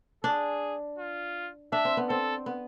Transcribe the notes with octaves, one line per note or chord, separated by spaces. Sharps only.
D4 G#4
F4
D4 E5
C4
B3
C4 A4
B3